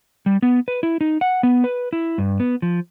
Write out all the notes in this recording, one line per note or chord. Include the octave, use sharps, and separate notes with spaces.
G3
B3
B4
E4
D#4
F#5
B3
B4
E4
G2
B3
F3